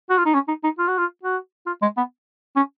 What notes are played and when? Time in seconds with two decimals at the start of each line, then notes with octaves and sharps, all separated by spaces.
0.10 F#4
0.18 F4
0.25 D#4
0.34 C#4
0.48 D#4
0.64 D#4
0.79 F4
0.88 F#4
0.98 F4
1.23 F#4
1.67 F4
1.82 G#3
1.97 B3
2.56 C#4